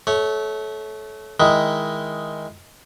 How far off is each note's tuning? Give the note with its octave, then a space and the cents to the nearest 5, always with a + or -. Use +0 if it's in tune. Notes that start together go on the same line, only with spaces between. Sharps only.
A3 -25 C#5 +0
D#3 +5 G#3 +0 E4 +0